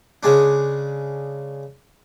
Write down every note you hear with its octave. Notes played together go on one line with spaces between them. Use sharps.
C#3 G#3 D4